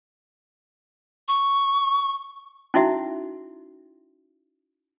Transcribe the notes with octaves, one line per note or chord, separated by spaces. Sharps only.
C#6
C#4 D#4 E4 F#4 E5